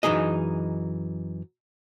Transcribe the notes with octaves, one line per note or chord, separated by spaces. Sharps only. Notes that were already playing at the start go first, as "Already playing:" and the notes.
F#2 E3 D#4 G#4 D#5